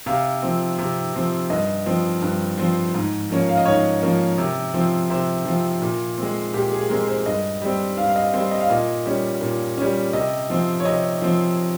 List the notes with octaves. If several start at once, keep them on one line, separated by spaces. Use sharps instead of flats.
C3 F5
F3 C4
C3
F3 C4
G2 D#5
F3 C4
G2
F3 C4
G#2
F3 A#3 C#4
F5
D#5
G#2 C#5
F3 A#3 C#4
C3
F3 C4
C3 C5
F3 C4
A#2
G#3 C4
A#2 G4
G#4
G#3 C4 A#4
C5
G2 D#5
G3 C4
G2 F5
F5
D#5
G3 C4 C5
D#5
F5
A#2 D#5
G3 C#4
A#2
G3 C#4
C3 D#5
F3 C4
C#5
C3 D#5
F3 C4